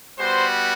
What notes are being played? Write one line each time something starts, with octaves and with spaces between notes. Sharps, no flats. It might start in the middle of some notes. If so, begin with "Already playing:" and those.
G3 B3 F#4 C5